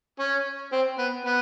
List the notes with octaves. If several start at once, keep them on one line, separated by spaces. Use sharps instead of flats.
C#4
C4
B3
B3